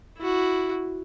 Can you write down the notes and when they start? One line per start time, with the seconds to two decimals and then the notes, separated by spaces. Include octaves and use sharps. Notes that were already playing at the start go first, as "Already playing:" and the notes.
0.18 E4 F#4